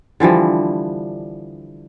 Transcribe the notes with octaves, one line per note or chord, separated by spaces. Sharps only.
D3 E3 F3 G3